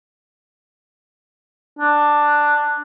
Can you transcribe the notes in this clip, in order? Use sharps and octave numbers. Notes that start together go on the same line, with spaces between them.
D4